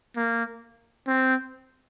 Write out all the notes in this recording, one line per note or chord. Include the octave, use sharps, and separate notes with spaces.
A#3
C4